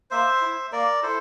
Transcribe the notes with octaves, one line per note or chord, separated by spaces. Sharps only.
A#3 C5 E5
E4
A#3 A#4 D5
E4 A4 C5